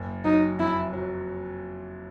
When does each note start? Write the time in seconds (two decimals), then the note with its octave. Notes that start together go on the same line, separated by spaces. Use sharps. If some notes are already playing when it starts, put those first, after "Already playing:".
Already playing: F#1
0.25 F#3 D#4
0.59 F2 E4
0.93 F#3